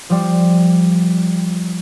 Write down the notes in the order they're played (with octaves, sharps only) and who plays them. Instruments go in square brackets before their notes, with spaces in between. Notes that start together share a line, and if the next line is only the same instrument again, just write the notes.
[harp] F3 G3 F4